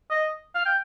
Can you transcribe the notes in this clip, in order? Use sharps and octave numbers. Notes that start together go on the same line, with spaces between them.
D#5
F5
G5